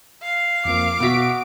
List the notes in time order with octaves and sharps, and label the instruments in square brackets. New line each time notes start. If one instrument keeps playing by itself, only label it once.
[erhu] F5
[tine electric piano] F2 F3 A#3 [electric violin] D6 D7
[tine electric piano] B2 E5 B6 [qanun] B3 F#4